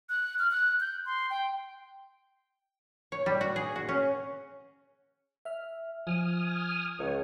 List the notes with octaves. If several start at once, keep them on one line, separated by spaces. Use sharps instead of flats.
F#6
F6
F#6
G6
C6
G5
C#5
G3
F#4
G#4
F#4
C#4
E5 F6
F3 G#5 D#6 F6
C#2 C#5